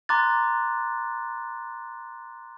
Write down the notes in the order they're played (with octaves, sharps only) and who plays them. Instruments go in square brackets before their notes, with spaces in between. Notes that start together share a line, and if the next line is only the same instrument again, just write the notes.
[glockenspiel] A#5 C6 D6 F#6 A6